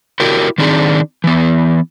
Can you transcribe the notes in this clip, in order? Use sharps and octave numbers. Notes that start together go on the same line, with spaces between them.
E4 F#4 G4 A#4
D#3 C4 D4 D#4 G#4
E3 B3